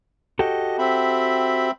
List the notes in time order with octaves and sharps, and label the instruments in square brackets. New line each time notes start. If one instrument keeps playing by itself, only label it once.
[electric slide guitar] F#4 G4 A4 [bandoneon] D#5
[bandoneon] C4 E5 B5